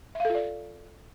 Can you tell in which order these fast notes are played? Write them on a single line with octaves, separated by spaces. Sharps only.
E5 F5 A4 F4 D5